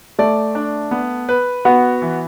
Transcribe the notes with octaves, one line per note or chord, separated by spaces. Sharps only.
A3 D5
D4
B3
B4
B3 F#4
E3